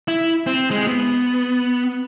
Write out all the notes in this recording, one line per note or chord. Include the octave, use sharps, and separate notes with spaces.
E4
C4
G#3
B3